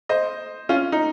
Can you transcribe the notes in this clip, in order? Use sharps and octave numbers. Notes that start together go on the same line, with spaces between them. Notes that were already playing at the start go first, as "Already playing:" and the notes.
C5 D#5
C#4 F4
D#4